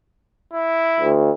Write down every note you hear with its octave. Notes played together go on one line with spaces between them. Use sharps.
E4
D2